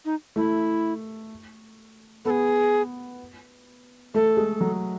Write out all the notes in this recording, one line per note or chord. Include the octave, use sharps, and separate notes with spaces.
D#4
A3 E4
B3 G#4 A4
A3 A4
G#3
F#3